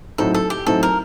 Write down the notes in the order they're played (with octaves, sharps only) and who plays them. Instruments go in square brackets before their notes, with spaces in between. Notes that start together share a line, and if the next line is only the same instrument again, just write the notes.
[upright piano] A2 F#3 C4 D#4 [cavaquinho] A4
[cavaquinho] A4
G4
[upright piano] A2 F#3 C4 D#4 [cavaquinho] A4
[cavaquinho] A#4